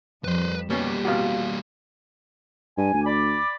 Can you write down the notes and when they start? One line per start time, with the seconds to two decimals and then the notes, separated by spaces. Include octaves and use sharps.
0.24 F2 F3 G3 B4 C5
0.70 B2 G3 A#3 C#4 G4
1.05 A1 F2 B2 F#4 F5
2.77 G2 G#5
2.93 D2
3.05 D5 B5 D6